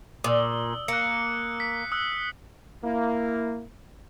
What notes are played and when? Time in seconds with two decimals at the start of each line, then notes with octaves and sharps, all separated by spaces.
0.24 A#2 D#6 E6
0.88 A#3 F#6 C#7
1.60 B6
1.92 D#6 E6 F#6
2.83 A#3 E4